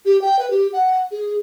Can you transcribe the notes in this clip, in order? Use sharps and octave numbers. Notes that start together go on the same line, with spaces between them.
G4
G5
B4
G4
F#5
G#4